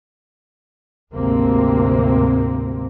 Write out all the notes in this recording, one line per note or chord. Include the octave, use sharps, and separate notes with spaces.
G#1 D2 C3 A#3 C4